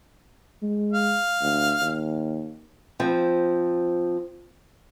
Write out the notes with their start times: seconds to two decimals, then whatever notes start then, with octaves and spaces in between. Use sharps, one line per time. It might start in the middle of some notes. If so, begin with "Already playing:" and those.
0.62 G#3
0.92 F5
1.42 D2
1.81 D#2
3.00 F3 C4